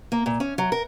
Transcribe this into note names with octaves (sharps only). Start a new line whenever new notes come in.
A#3
A#2
C#4
F#3
A#4